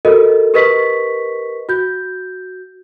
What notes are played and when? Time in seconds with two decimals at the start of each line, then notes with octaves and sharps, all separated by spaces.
0.05 F#4 A4 A#4 D#5
0.54 G4 A#4 B4 D#5 C#6 B6
1.69 F#4 G6